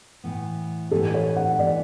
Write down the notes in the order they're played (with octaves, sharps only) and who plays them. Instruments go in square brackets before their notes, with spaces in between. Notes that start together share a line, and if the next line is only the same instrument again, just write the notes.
[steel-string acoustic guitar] A2 E3 B3
[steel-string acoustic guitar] A2 E3 B3 [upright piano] A4
[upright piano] C#5
F#5
[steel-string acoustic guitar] A2 E3 B3 [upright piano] D5